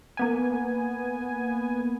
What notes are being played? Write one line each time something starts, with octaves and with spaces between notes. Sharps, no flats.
A#3 B3 G#5